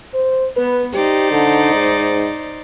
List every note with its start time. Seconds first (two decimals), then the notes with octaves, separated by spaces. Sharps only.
0.14 C5
0.56 B3 B4
0.93 D#4 G4 C5 D5
1.31 D3
1.74 G#2